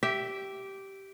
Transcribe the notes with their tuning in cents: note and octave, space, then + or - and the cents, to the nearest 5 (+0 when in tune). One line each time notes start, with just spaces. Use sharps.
G4 -10 E5 +0